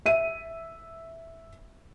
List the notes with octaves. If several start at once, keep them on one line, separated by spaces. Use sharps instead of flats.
E5 D#7